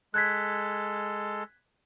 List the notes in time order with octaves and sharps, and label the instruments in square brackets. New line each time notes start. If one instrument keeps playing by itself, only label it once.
[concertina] G#3 A4 [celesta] F#6 G#6 B6